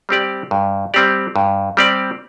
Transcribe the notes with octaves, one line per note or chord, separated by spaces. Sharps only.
G3 C4 G4 D5
G2
G3 C4 G4 D5
G2
G3 C4 G4 D5